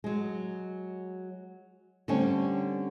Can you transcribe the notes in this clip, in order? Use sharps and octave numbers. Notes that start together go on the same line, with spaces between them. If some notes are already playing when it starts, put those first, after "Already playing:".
F#3 G#3
D3 G3 A3 C4 C#4